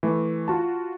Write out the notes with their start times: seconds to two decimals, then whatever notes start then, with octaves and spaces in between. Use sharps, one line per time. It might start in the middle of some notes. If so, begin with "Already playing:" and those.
0.03 E3 A3
0.48 F4 F#4 A5